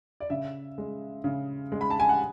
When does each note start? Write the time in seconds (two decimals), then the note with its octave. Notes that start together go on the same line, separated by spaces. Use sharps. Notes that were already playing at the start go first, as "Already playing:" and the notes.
0.20 D5
0.30 C#3 E5
0.78 G#3
1.24 C#3
1.72 G#3
1.81 B5
1.90 A5
2.00 G#5
2.09 F#5